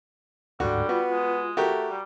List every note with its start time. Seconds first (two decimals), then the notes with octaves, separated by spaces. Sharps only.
0.60 D2 G#2 D3 G3 F#4
0.89 B3 F4 F#4
1.11 G#3
1.57 A3 F#4 G4 A#4
1.89 G3